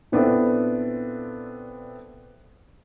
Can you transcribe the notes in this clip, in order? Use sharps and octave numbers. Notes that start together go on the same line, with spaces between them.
A#2 B3 C4 D4 E4 A4